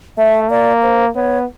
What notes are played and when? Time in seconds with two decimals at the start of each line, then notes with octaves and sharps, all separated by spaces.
0.18 A3 E5
0.50 A#3 D5
0.83 C5
1.15 B3 C#5